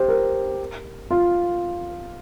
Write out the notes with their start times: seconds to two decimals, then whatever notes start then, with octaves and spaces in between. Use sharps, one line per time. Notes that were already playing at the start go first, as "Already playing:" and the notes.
Already playing: G4 C5
0.08 A#4
1.11 F4